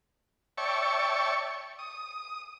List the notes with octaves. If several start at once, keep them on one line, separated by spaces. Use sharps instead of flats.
C#5 D5 E5 G5 A5 C#6
D#6